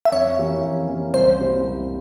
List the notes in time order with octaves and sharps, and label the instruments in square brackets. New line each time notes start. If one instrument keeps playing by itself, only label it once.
[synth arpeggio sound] E5
[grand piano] F2 [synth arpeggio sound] C#5
[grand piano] E3 A#3 C#4 G4
F2
E3 A#3 C#4 G4
[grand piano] C2 [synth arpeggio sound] C5
[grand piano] C3 G3 A#3 E4
C2